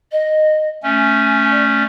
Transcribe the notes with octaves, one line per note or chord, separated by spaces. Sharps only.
D#5
A3 C#4 G#5
D5